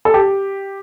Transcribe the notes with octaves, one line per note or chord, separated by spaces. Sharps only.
A4
G4